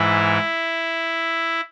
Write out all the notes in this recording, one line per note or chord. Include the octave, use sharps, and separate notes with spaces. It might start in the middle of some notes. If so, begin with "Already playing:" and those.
Already playing: G#2 E3 E4